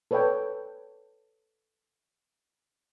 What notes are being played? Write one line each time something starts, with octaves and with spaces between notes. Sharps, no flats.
A4 B4 C#5 D5 G5